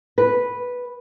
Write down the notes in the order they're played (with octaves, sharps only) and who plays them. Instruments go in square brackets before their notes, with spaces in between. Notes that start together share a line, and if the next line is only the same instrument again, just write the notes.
[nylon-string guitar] B4